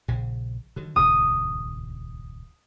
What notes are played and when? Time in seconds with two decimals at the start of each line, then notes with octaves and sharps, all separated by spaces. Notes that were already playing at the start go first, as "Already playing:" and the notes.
0.08 A#1 C#3
0.76 D3 D#3 F#3
0.96 D#1 C#2 G2 D#6